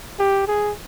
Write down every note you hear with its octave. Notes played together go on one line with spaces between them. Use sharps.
G4
G#4